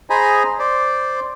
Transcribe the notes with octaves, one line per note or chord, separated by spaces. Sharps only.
G#4 C5 D#5 G#5 A#5 B5
C5 D5